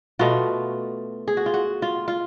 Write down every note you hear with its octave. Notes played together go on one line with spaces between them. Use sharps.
B2 A3 F4 F#4
G#4
F#4
F4
F#4
F4
F4